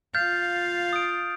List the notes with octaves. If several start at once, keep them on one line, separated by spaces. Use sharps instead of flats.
F4 F5 F6 G6 A6
D#6 D7